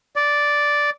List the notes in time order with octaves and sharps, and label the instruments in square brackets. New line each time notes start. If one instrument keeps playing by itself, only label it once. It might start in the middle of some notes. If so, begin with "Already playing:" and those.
[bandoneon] D5